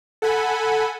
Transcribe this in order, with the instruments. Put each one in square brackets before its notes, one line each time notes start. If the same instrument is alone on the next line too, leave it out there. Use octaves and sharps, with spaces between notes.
[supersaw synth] A4 F#5 G#5 B5